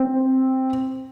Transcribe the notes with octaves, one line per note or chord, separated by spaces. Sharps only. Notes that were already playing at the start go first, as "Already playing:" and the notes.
Already playing: C4